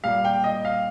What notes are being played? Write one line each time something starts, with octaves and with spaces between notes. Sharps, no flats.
A#2 G3 F5
G5
D#5
F5